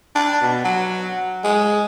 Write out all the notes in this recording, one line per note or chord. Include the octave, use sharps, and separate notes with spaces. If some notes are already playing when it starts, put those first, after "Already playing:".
D4
B2
F#3
G#3